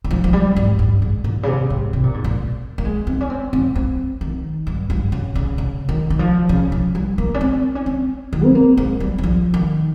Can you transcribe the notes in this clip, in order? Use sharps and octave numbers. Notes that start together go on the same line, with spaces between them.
D#3
F3
F3
G3
G#2
G2
G#2
A#2
C#3
C3
G#2
C3
A#2
G#2
A#2
A#3
G#3
C4
C#4
C4
C4
C4
D#3
G2
G2
C#3
C#3
C#3
D#3
D#3
F3
C#3
F3
G3
A#3
C#4
C4
C#4
C4
D#3
C4
A#3
G#3
G3
G3
F3
D#3